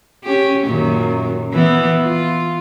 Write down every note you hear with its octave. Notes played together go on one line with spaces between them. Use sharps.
C#4 G4
F#2 A#2 D#3
E3 B3
F4